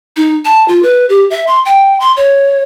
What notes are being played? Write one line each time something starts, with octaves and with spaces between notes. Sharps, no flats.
D#4
A5
F4
B4
G4
E5
C6
G5
C6
C#5